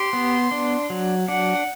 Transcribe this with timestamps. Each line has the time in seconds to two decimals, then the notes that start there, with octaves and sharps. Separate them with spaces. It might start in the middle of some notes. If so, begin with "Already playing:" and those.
Already playing: G4 C6
0.13 B3
0.51 D4
0.90 F#3
1.28 D4 F#5